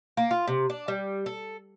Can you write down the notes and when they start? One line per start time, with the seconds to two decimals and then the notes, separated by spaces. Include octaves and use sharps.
0.17 A#3
0.31 F4
0.47 C3
0.70 D4
0.88 G3
1.26 A4